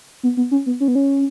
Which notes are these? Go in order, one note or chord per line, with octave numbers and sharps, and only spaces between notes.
B3
B3
C#4
B3
C#4
B3
C#4